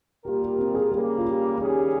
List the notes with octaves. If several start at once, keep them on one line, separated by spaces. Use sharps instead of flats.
A#2 G3 A#3 F4 G4 A#4
G4
C4
G#4
C#3 G3 A#3 G#4
F4
G4
D#2 C#3 G3 C#4 G4 G#4